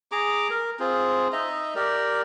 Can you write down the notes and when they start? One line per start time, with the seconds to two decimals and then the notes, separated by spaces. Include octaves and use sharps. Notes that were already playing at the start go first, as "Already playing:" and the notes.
0.12 G#4 A#5 D6
0.50 A#4
0.80 C4 F4 G#4
1.32 D#4 D#5 E5 A#5
1.75 G4 A#4 D5